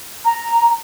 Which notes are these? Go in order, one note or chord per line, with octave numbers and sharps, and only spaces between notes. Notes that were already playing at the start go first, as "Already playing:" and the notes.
A#5